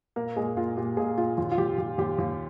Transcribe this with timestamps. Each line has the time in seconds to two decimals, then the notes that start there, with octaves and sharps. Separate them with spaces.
0.16 A#2 A#3 A#4
0.36 A#2 G#3 G#4
0.57 A#2 F4
0.77 A#2 G4
0.97 A#2 G#3 G#4
1.18 A#2 F4
1.38 D#2 F4
1.51 F4
1.58 D#2 G4
1.78 D#2 G4
1.98 D#2 G4
2.19 D#2